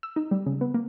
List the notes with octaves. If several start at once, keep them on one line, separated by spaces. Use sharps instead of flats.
E6
D#4
G3
C#3
B3
A#3